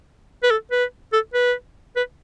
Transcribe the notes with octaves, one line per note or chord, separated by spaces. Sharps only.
B4
A4
B4
A4
B4
B4